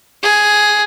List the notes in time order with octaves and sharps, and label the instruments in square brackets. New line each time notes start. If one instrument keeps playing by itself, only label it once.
[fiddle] G#4